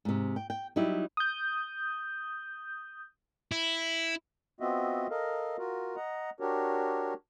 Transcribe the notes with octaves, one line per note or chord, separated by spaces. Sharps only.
G#2 C3
G5
G5
F#3 G3 D#4 E4 G4
D#6 G6
E4
B3 C4 F4 F#4 D#5 E5
A4 A#4 D#5 F5
F4 F#4 A#4
D#5 F#5 A#5
D4 F#4 G4 A#4 C#5